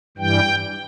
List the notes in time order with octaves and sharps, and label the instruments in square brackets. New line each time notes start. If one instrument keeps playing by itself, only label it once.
[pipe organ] G2 E3 G3 G5